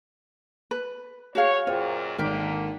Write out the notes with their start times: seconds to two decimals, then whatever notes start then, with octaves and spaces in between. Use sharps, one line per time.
0.71 B4
1.35 F#4 G#4 C#5 F5
1.67 F#2 A#2 F4 G#4 C5 G5
2.18 G#1 D3 A#3 D#4 A#4 G5 B6